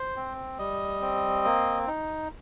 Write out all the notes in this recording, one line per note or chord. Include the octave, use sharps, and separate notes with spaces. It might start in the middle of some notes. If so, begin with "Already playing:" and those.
Already playing: C5
C4
G3 D#5
C4
A#3
D#4